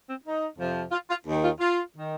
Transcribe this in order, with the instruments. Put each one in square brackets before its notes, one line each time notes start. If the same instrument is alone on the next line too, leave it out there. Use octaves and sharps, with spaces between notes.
[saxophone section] C4
D#4
F2 C3 F3
F4
F4
D#2 D#3
F4
F4
D#3